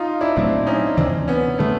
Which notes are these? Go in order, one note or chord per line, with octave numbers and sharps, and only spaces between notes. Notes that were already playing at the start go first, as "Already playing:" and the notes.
Already playing: D#4 F4
D4 E4
A#2 F#3 A3 C4 D4
C#4 D#4
D2 C3 E3 C4 D4
B3 C#4
D3 G3 A3 B3